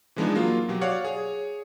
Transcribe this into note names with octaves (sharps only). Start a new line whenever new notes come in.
E3 F3 G#3 B3 D4 D#4
F#3 A#3 F4
B2 F#3 G4
F#4 C#5 D5 F5 F#5
G#4 C#5